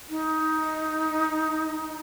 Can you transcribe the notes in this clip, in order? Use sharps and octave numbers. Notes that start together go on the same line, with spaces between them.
D#4